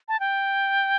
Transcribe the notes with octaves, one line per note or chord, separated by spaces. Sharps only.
A5
G5